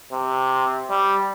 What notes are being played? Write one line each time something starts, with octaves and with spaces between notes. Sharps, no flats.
C3
G3